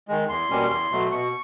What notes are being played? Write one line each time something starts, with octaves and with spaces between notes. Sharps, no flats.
D#3 G#3
E2 C6
B2 G3 A#3 C#4
E2
B2 F#3 A3
B2 C#6